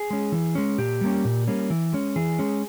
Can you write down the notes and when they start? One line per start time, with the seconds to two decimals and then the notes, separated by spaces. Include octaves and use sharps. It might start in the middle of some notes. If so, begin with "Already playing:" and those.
Already playing: G#4
0.10 G#3 C#4
0.32 E3
0.55 G#3 C#4
0.78 A#2 G4
1.01 G3 A#3 C#4
1.25 A#2
1.47 G3 A#3 C#4
1.70 E3
1.93 G#3 C#4
2.16 E3 G#4
2.39 G#3 C#4